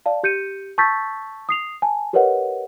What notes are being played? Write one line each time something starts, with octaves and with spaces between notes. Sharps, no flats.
D5 F5 A5
G4 G6 C#7 D#7
A5 C#6 E6 G6 A6 B6
D#6 C7 F7
G#5 A5
G4 A#4 B4 C#5 D#5 F#5